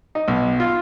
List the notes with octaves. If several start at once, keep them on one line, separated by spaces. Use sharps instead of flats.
D#4
B1
F4